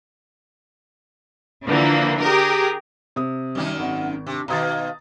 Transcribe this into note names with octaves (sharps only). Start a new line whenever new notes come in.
D3 E3 F3 A#3
G4 G#4 A#4
C3 D#6
F#2 D#3 G3 D#4
G#1 F#5
C3 D4
B2 D#3 F5 A#5 D#6 A6